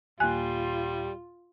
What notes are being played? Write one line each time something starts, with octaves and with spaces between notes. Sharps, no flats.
D#2 A#2 G3 F4 G#5 F#6